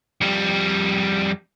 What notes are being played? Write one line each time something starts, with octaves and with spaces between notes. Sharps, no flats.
F2 G3